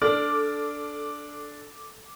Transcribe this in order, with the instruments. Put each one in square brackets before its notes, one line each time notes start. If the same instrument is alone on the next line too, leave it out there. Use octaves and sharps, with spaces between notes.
[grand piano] D4 D5 [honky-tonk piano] A4 F6 [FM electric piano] D6